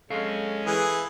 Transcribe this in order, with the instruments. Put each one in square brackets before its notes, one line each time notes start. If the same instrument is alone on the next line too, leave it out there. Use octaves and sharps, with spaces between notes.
[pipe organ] G#3 C#4 [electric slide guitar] A4 F5
[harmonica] E3 G#4